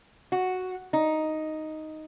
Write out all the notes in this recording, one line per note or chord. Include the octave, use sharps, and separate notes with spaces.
F#4
D#4